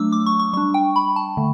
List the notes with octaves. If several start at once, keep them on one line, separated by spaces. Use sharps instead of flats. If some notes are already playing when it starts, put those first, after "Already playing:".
Already playing: F#3 A3 D4 D6 E6
D6
C#6
C#6
G3 D4 C#6
G5
B5
A5
D3 A3